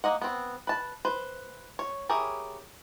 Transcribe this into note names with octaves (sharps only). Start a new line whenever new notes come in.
A#3 D#5 F#5
B3 C4
B4 A5
B4 C5
C#5
E4 G4 G#4 A#4 C#5